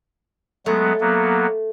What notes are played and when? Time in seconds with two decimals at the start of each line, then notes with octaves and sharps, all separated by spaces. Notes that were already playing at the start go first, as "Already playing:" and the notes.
0.66 F#3 G#3 A3 B3
1.01 F#3 A#3 B3